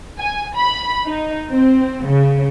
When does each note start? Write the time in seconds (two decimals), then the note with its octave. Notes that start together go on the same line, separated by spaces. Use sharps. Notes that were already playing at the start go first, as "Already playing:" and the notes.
0.18 G#5
0.55 B5
1.06 D#4
1.53 C4
2.08 C#3